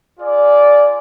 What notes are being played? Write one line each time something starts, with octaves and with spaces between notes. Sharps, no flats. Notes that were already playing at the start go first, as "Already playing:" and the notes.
F4 G#4 D5